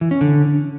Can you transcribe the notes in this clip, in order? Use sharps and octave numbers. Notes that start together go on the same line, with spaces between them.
E3
C#4
D3